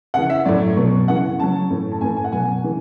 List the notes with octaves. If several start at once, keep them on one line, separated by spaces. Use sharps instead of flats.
C#3 E3 F#5
E5
A2 F#3 D5
B2 F#3
C#3 E3 F#5
C#3 F#3 A5
A2 E3
A5
A2 E3 G#5
G#5
F#5
B2 F#3 G#5
C#3 E3